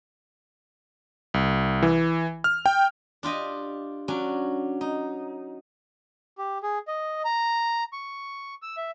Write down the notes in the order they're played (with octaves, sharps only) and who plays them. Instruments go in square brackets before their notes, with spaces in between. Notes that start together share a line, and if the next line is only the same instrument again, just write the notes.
[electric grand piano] C2
E3
F6
G5
[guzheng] D4 F4 G4 D#5
F#3 C#4 D4
D#4
[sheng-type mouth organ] G4
G#4
D#5
A#5
C#6
E6
E5